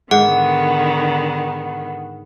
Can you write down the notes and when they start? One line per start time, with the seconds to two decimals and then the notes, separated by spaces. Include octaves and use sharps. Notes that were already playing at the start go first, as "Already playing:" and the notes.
0.11 G#2 D3 D#3 B3 F#5